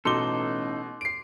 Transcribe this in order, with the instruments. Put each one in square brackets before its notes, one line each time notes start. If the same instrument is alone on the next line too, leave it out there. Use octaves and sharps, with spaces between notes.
[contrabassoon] A1 [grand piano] B2 G7 [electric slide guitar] D#4 A4 [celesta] C6 D6
[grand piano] C7 D7